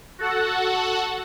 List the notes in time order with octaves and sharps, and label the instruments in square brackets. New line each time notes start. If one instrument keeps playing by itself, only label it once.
[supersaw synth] F#4 A4 F#5